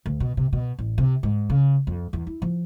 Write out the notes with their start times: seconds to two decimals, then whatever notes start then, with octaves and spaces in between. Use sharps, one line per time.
0.06 D2
0.20 B2
0.37 C3
0.53 B2
0.79 A1
0.98 C3
1.23 G#2
1.50 C#3
1.87 F2
2.13 E2
2.27 E4
2.42 F3